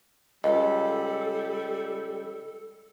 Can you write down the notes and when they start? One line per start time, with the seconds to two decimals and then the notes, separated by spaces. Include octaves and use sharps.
0.44 C#2 G3 A4 D#5